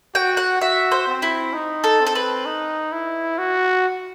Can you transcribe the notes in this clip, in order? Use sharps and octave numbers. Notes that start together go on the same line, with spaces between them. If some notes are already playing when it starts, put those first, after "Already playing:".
F#4 G5
F#5
F#4 E5
C5
C4
E4
D#4
A4
C4
A4
B4
D#4
E4
F#4